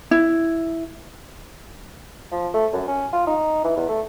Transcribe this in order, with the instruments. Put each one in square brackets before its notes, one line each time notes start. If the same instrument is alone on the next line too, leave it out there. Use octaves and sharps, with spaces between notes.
[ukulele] E4
[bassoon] F3
A3
F#2
C#4
F4
D#4
E3
E2
A3